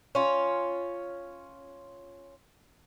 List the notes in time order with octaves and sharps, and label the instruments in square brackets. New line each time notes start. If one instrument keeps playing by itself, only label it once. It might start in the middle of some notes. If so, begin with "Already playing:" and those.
[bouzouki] C#4 F4